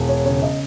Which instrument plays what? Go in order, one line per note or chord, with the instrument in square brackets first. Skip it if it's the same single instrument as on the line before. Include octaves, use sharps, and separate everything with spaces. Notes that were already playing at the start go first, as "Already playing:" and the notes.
Already playing: [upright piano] E1
C#5
C#3 C#5
D#5